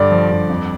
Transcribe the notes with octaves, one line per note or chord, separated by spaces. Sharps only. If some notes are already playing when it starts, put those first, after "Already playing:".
Already playing: G2 D3 D5
F3
G2
F2